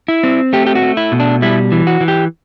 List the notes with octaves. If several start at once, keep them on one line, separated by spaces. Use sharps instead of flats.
E4
C4
A3 G4
G4
F#4
A3
E4
B2
D4
G3 E4
E3
F#4
E3
G4